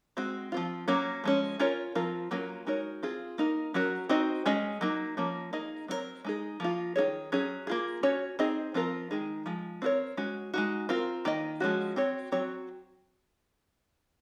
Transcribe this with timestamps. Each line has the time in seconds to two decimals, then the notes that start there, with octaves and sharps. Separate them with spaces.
0.17 G#3 C4 F#4
0.52 F3 C4 F4
0.88 F#3 A#3 C#4
1.24 F3 G#3 C#4
1.60 C#4 F4 A#4 C#5
1.95 F3 C4 F4 A#4
2.31 F#3 A#3 C#4 F4 A#4
2.67 G#3 D#4 F#4 A#4 C#5
3.03 C4 F4 G#4
3.38 A#3 D#4 A#4
3.74 F#3 C#4 F#4 A#4
4.09 C4 D#4 F#4 C5 D#5
4.46 G#3 C#4 G#4 D#5
4.81 F#3 A#3 D#4
5.17 F3 A#3 C#4
5.53 A#3 D#4 G#4 D#5
5.88 F#3 C4 D#4 A#4 C#5
6.25 G#3 D#4 G#4
6.60 F3 A#3 F4
6.96 D#3 A#3 D#4 G#4 C#5
7.32 F#3 C#4 G#4
7.67 A#3 F4 G#4
8.03 C#4 F#4 C#5
8.39 C4 D#4 G#4 C5 D#5
8.74 F3 C4 F4 A#4
9.11 D#3 G#3 D#4 G#4
9.46 F3 G#3
9.82 C4 D#4 F#4 A#4 C#5
10.17 G#3 C#4 F#4
10.54 G#3 D#4 F#4
10.89 C4 F4 A#4
11.25 D#3 A#3 D#5
11.60 F3 G#3 C#4 F#4
11.96 C4 F#4 C#5
12.32 F#3 C4 F#4 C#5